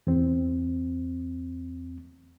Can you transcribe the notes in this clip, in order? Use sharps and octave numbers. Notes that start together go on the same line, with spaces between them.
E2 C4